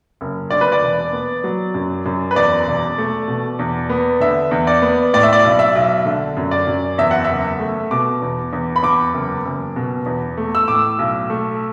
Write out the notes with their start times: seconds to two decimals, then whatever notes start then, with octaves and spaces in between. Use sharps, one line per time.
0.21 F#1
0.50 D2 D5
0.61 B4
0.72 D5
0.82 E1
1.13 B3
1.44 F#3
1.74 F#2
2.06 F#2
2.31 B4
2.36 E2 D5
2.67 E1
2.98 A3
3.28 B2
3.59 E2
3.89 B3
4.20 D3 E5
4.51 E2
4.67 D5
4.82 B3
5.13 A2 D5
5.23 E5
5.33 D5
5.44 B1
5.59 E5
5.75 B1
6.05 D3
6.37 F#2
6.51 D5
6.67 F#2
6.98 E2 E5
7.11 F#5
7.24 F#1 E5
7.60 A3
7.91 B2 D6
8.22 E2
8.53 E2
8.76 B5
8.83 E2 D6
9.13 F#1
9.45 F#1
9.76 B2
10.06 E2
10.37 A3
10.55 E6
10.67 A2 D6
10.99 B1
11.30 A3